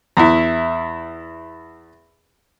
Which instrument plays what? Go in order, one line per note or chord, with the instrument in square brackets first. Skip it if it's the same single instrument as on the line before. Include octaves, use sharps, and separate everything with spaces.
[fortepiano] E2 E4